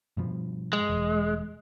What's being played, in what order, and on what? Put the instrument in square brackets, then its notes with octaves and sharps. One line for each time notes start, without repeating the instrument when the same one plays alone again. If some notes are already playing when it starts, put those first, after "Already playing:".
[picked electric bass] G2 B2 F3
[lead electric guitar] G#3
[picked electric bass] E1